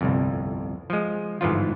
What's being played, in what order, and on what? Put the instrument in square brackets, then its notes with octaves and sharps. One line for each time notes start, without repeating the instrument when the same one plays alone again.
[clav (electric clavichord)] G1 C2 F2
F3 G#3
G1 G#2 E3 F3 F4